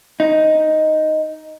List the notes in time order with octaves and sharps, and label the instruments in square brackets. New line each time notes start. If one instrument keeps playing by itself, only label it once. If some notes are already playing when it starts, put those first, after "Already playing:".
[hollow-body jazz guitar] D#4